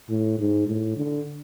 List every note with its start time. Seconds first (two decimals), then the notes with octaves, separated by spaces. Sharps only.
0.10 A2
0.38 G#2
0.68 A2
0.97 D3